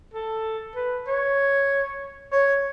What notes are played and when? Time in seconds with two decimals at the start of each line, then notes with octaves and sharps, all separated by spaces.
0.14 A4
0.75 B4
1.07 C#5
2.32 C#5